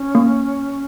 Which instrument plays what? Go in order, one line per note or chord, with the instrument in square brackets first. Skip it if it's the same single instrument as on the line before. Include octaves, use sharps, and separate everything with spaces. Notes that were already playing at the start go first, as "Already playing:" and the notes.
Already playing: [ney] C#4
[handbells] A#3